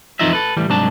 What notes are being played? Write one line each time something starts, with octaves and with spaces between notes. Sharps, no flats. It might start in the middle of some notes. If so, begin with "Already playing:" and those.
F2 E3 D#4 F4 D#5 E5
A4 B4
A2 E3 G3
C2 G#2 F#3 D4 A5